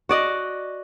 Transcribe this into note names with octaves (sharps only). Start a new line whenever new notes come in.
F#4 D5 D#5